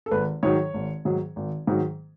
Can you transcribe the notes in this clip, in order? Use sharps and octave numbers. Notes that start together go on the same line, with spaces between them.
A4
G#1 B4
G#2 D#3 F#3 C#5
G#1
G#2 D#3 F#3
G#1
G#2 D#3 F#3